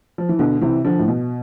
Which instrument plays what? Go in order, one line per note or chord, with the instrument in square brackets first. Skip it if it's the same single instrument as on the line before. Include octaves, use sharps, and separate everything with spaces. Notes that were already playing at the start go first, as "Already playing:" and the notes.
[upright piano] F3
E3
B2 D3
C3 E3
D3 F3
A2
B2